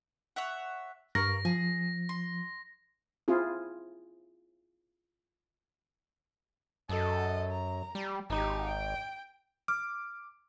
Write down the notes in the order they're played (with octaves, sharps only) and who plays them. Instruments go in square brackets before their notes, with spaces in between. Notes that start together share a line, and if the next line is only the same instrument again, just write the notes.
[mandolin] C#5 E5 F#5
[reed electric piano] G2 [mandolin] A#4 F5 C#6 [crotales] A#6
[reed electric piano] F3 [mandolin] G#4
[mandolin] C6
[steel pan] C4 E4 F4 G#4
[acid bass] F#2 [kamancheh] A4 D#5
[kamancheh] A#5
[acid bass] G3
[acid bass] G#1 [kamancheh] D#4 G4
[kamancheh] G5
[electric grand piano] D6 [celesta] F6